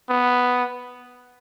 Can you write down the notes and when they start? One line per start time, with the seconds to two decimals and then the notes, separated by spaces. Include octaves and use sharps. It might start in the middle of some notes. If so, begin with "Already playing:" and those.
0.10 B3